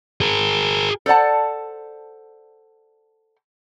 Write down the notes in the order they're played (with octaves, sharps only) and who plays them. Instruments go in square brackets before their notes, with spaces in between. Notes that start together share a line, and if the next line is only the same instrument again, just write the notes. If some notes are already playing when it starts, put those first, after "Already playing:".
[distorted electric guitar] G#4 A#4
[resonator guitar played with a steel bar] A4 C5 D5 F#5 A5